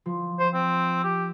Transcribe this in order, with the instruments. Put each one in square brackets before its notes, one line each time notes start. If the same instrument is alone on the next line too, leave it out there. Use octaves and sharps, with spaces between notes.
[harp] F3
[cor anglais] C5
C4
G4